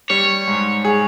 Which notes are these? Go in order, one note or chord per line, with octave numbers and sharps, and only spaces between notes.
G3 C#5
G#2
G#4